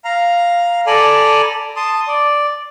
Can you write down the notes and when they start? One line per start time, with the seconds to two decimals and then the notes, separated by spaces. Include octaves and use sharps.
0.04 F5 A#5
0.87 A4 D5 G#5 A#5 B5
1.76 A5 C6 D#6
2.08 D5